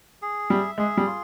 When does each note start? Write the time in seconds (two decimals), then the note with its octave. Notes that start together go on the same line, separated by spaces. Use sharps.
0.22 G#4
0.50 G3 E5
0.78 G#3 G#4
0.97 G3
1.06 F4